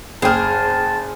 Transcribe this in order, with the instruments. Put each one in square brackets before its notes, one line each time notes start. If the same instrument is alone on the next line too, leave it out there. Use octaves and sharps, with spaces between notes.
[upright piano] F#1 G5 F6 [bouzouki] G#4 C5 [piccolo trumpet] A5